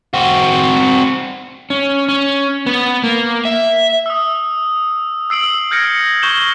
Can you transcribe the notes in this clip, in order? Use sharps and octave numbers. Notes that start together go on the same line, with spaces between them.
C4 F#4
C#4
C#4
B3
A#3
E5
D#6 E6
E6 C7 D7 F#7
F6 G6 G#6 A#6 C#7 D7
C#6 G6 E7 G7